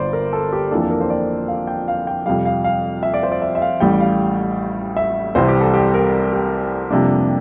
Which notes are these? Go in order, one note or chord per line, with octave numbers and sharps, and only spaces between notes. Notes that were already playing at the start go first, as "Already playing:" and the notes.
Already playing: G1 G2 C5 D5
A#4
A4
G4
F2 E3 A#3 D4 A4
A4
A#4
C5
D5
F5
G5
F5
G5
F2 C3 G3 F5
F5
F5
E5
D5
C5
D5
E5
E5
F5
A1 A2 G3 G5
F5
E5
C2 C3 E3 G3 C5
G4
A4
G4
A#4
G4
F2 C3 G3 A#3 D4